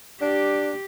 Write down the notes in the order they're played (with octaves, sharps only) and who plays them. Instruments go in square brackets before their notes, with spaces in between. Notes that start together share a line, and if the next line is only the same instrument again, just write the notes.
[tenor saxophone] D4 [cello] G4